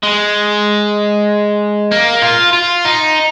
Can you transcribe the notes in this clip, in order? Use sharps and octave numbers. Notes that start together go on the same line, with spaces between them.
G#3
A#3
F4
F4
D#4